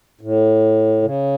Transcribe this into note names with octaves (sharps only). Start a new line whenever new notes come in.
A2
C#3